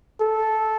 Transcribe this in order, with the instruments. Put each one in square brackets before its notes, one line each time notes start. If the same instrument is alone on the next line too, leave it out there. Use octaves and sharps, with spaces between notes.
[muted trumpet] A4